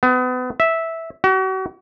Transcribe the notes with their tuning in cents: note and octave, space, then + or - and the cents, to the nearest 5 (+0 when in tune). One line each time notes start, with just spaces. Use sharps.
B3 +35
E5 -10
F#4 +40